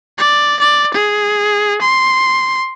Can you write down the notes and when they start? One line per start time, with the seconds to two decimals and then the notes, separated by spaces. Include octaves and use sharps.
0.18 D5
0.60 D5
0.94 G#4
1.82 C6